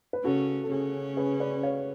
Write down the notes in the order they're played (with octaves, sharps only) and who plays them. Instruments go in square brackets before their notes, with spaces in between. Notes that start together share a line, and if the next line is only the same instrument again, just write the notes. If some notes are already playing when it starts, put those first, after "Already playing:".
[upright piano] B4
[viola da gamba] C#3 C#4 [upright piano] F#4 A4
[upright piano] A4
[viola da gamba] C#3 C#4 [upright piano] G#4
[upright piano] G#4 B4
B4 D5
C#5 F5